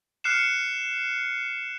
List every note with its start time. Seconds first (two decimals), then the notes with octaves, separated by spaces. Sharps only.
0.24 F6 F#6 C7 C#7 E7